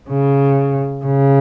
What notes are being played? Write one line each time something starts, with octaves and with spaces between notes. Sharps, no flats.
C#3
C#3